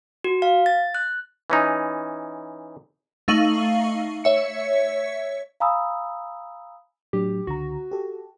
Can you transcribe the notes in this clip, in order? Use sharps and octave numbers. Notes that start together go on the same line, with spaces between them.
F#4
F5
A6
F#6
E3 C#4 D#4
A3 D#4 F5 C#6 D#7 F#7
C#5 E5 C#7
F5 G#5 A#5 B5 D#6 E6
A2 F#3 D4 G4
C#2 D3 F#4 A#5
G4 A4